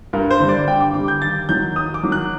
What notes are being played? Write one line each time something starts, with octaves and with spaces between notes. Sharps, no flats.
G2 A#4
C5
D3 G3
D5
G2 G5
D6
D3 G3 D6
G6
D#2 A6
D#3 F#3 G6
D#2 D#6
D6
D#3 F#3
F#6